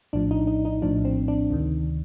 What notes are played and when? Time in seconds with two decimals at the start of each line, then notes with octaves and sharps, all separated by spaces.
0.13 A#1 A2 F3 D4
0.31 D#4
0.47 D#4
0.65 D#4
0.82 A#1 A2 F3 D4
1.05 C4
1.28 D4
1.50 D2 C3 D#3